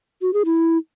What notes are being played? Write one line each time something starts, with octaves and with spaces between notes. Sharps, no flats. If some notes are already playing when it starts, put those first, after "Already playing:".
F#4
G#4
E4